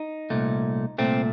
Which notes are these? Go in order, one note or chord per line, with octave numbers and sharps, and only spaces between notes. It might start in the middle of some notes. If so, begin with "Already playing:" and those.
Already playing: D#4
C2 A#2 A3
C2 A#2 A3 C4